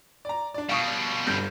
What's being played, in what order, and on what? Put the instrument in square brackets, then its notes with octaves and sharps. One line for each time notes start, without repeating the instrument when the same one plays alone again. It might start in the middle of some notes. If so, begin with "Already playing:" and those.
[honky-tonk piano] D5 A#5
D4 D5
[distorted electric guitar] B2 G3 [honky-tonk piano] F5 C#6 D#6
[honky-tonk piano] G1 G2 G6